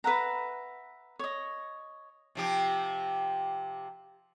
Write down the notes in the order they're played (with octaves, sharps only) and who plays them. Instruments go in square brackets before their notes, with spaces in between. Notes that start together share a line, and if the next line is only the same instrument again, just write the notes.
[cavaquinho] B4 E5 F#5 A#5
C#5 D#5
[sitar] C3 F3 G4